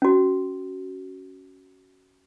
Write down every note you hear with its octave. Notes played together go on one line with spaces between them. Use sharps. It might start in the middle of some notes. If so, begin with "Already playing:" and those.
C#4 F#4